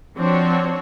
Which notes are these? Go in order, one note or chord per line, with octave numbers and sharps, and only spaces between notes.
F3 C4 D4 F#4 C#5